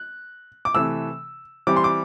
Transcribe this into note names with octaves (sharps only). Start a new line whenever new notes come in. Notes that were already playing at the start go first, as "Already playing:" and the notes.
Already playing: F#6
D6
C3 E3 A3 E6
E3 G3 C4 D6
C6
D6